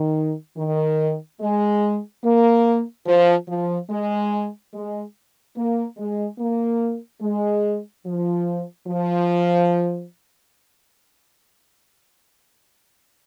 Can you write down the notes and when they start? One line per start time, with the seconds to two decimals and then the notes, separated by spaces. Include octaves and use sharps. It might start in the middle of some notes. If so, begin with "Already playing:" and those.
Already playing: D#3
0.57 D#3
1.41 G#3
2.24 A#3
3.06 F3
3.48 F3
3.90 G#3
4.73 G#3
5.56 A#3
5.98 G#3
6.39 A#3
7.21 G#3
8.06 F3
8.88 F3